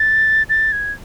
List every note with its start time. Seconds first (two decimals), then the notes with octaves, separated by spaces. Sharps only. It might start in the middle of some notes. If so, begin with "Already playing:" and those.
Already playing: A6
0.49 A6
0.72 G#6